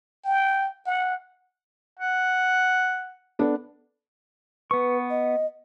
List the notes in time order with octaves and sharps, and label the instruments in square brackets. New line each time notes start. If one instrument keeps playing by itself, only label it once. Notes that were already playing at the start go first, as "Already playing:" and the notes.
[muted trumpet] G5
F#5
[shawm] F#5
[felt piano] B3 D4 A4
[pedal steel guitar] B3 C#6 [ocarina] B4
[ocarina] D#5